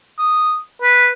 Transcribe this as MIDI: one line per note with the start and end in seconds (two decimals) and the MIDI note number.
0.19 0.58 87
0.82 1.10 71